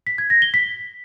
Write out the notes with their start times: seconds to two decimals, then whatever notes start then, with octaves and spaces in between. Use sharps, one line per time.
0.07 B6
0.18 G#6
0.30 A#6
0.42 G7
0.54 B6